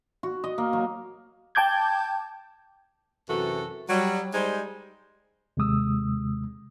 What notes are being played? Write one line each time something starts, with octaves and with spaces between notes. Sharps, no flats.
F#4
D#5
A#3
F#3
G5 A5 D6 G6 G#6
F#2 C3 E3 F#4 A4
F#3 G3
G3 G#3 D#4 C5
D#2 C3 G#3 D#6 E6